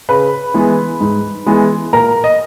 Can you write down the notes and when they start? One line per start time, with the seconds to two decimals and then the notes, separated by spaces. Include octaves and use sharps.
0.09 C#3 B4 B5
0.54 E3 G#3 B3
1.01 G#2
1.46 E3 G#3 B3
1.93 A#2 A#4 A#5
2.24 D#5